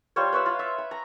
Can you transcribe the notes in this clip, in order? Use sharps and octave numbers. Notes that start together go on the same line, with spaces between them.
G3 F4 C5 C#5
B4 C#5 E5 F#5
F4
E5
B5
A#5